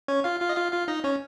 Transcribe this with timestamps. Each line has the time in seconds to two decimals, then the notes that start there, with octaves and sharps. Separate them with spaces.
0.08 C#4 C#5
0.24 F4 F5
0.41 F4 F5
0.49 D#5
0.57 F4 F5
0.72 F4 F5
0.88 D#4 D#5
1.04 C#4 C#5